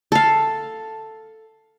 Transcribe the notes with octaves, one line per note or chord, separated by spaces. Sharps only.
A4 F5